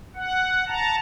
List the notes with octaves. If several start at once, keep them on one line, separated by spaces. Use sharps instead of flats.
F#5
A5 A#5